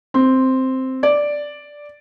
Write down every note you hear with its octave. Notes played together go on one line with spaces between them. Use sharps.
C4
D5